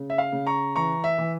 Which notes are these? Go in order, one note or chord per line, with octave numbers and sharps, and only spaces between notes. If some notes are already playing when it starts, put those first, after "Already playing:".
Already playing: C#3
E5
F5
C#3
A#5 C#6
E3 A#5 C#6
E5
E3